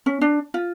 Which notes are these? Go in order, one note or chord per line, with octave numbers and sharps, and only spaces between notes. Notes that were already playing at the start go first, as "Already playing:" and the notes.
C#4
D4
F4